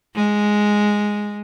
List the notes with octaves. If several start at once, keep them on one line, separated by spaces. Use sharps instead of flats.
G#3